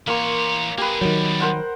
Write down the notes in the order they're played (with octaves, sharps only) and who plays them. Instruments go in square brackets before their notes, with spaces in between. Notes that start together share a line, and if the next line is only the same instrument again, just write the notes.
[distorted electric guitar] E3 C#5 [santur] A#3 C6
[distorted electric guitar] A#3 G#4 [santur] G4 B4
[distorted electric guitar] B2 G3 [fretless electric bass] D#3 F#3
[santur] A#4 C5 F#5